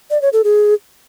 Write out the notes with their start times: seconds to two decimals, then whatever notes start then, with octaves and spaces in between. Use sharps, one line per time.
0.11 D5
0.22 C#5
0.33 A4
0.44 G#4